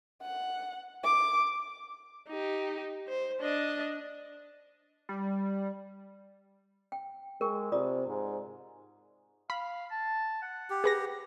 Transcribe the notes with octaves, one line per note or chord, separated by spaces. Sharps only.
F#5
D6
D#4 G4
C5
D4 D#5
G3
G5
G#3 A#4 G5 C#6
C3 F4 D5 D#6
G#2
F5 B5
A5
F#5
G4
G#4 B4 A#6